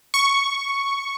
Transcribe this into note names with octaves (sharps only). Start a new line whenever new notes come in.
C#6